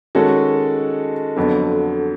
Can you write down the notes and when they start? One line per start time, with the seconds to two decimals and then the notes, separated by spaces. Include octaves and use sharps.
0.15 D#3 G#3 C#4 F#4 A4
1.36 F2 D3 F#3 B3